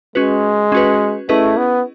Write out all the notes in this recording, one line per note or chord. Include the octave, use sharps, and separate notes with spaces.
G#3 C#4 F#4 B4
C#4 F#4 B4
A3 C#4 E4 G#4 B4 D#5
B3